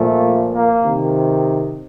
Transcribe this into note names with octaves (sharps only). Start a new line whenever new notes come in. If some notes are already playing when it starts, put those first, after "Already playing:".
Already playing: A#2 F3 A3
A#3
C3 D#3